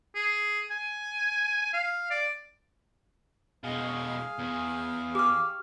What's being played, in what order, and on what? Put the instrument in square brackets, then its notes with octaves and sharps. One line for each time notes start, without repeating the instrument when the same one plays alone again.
[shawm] G#4
G#5
F5
D5
[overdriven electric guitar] B2 G#3 [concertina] G#4 F5
[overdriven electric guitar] E2
[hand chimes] G4 F6 [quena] D6